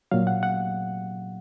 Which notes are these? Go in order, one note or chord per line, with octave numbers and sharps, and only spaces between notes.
A#2 F#3 F5
F#5
F#5